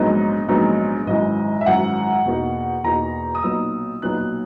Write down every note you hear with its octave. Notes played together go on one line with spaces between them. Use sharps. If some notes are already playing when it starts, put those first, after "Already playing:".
Already playing: A#1 G#2 F#3 B3 D#4 D#5
A#1 G#2 F#3 B3 D#4
G#1 F#2 E3 D#5
E5
G#1 F#2 E3 F#5
E2 B2 A#3 D#4
E2 B2 A#3 D#4 A#5
D#6
B1 A#2 F#3 B3 D#4 E6
B1 A#2 F#3 B3 D#4 F#6
F#6